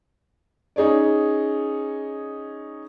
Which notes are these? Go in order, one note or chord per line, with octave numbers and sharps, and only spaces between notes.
C#4 D#4 G#4 C#5 D5